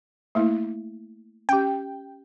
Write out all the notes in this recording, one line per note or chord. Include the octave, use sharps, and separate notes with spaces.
A3 A#3 E4
C#4 G4 G5